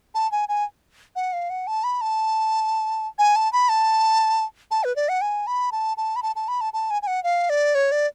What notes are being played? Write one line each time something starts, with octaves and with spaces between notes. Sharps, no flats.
A5
G#5
G#5
F#5
F5
F#5
A5
B5
A5
G#5
A5
B5
A5
A5
B4
D5
F#5
G#5
B5
A5
A5
B5
A5
A5
B5
A5
A5
G#5
G#5
F#5
F5
D5
C#5
D5